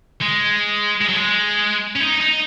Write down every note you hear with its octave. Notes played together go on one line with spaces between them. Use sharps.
G#3
G#3
F#3
G#3
C#4
D#4
D#4